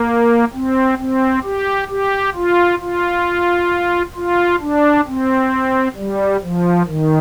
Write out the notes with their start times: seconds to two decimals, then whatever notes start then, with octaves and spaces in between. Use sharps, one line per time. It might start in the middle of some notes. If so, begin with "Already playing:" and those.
Already playing: A#3
0.54 C4
0.98 C4
1.44 G4
1.89 G4
2.35 F4
2.80 F4
4.15 F4
4.60 D4
5.07 C4
5.96 G3
6.42 F3
6.87 D#3